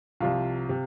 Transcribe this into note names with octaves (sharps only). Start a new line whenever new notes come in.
C2 C3 F3 F4
C3